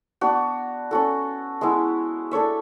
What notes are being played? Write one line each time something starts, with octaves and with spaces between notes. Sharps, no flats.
B3 D4 F#4
C#4 F#4 A4
G#3 B3 E4
D4 A4 C#5 E5